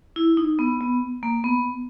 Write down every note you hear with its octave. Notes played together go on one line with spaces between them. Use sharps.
E4
D#4
B3
B3
A#3
B3